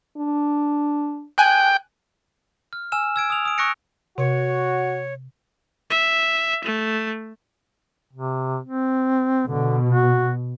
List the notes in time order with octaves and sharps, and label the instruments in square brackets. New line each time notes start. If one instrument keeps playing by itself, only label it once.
[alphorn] D4
[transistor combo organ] G5 [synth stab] G#5 F#6
[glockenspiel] F6
G#5 E6 F6 E7
E6 G#6 D7
D#6 F7
D#6 D7
C#6 E6 F#6 A#6 C#7 D7
[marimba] C3 [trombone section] F#4 [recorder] C#5
[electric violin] E5
A3
[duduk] C3
C4
[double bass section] B2 [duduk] D3
[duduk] F#4